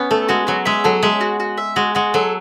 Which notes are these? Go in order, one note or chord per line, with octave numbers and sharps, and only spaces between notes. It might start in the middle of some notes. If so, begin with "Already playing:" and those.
Already playing: B3 C#4
A3 A4
G#3 F#4
F#3 F#4
G#3 E5
F#3 A4
G#3 E5
F#4
F#4
E5
G#3 F#4
G#3 F#4
F#3 A4